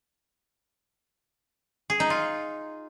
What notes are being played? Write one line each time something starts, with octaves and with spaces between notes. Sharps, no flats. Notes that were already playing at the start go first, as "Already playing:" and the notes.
G#4
D#4
F4